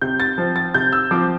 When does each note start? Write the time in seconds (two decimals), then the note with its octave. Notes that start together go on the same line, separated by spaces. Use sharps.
0.02 C3 G6
0.20 A6
0.38 F3 C4
0.56 A6
0.74 C3 G6
0.93 E6
1.11 F3 C4 D6